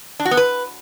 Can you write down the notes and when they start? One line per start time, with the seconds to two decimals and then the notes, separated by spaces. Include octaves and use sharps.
0.20 D4
0.25 F#4
0.31 B3
0.37 B4